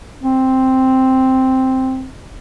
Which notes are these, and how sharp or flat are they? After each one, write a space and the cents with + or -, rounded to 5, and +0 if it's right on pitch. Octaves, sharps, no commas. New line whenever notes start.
C4 +0